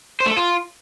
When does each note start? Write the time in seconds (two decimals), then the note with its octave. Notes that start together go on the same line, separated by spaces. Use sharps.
0.20 C5
0.26 A3
0.31 A4
0.37 F4